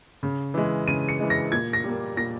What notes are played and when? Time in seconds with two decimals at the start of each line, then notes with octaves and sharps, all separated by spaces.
0.23 C#3
0.54 E3 G#3
0.88 C#3 D#7
1.09 C#7
1.20 E3 G#3
1.30 A#6
1.52 A#2 G#6
1.73 A#6
1.84 G3 A#3
2.17 A#2 A#6